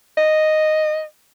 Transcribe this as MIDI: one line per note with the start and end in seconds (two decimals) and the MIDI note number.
0.17 1.03 75